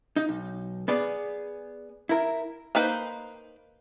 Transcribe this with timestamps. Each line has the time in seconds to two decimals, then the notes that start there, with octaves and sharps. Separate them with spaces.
0.16 D#4
0.29 B1
0.88 B3 G#4 D5
2.09 E4 A#4
2.75 A#3 D#4 B4 C5